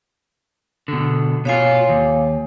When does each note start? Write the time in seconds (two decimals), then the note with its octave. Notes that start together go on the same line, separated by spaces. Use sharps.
0.88 B2 D3
1.45 B2 F4 C#5 F5 G#5
1.89 D#2